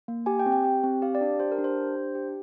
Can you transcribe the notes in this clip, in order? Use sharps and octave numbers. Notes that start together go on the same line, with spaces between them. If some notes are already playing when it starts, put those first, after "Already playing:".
A#3
G4 G#5
G5
C4
G5
G4
C4
G4 F5
D5
D4
G4 C5
A#4
D4
C5
G4
D4
G4